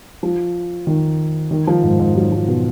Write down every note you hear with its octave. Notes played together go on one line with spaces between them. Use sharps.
F3
D#3
D#3
F3
G#2
G#2
F#3
F3
B2